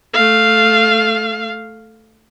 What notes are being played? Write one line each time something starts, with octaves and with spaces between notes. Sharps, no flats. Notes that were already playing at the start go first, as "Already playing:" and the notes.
A3 F5